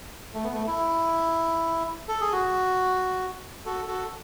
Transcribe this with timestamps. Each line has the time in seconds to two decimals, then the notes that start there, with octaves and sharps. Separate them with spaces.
0.34 A3
0.43 B3
0.53 A3
0.67 E4
2.08 A4
2.21 G#4
2.33 F#4
3.66 F#4 A4
3.88 F#4 A4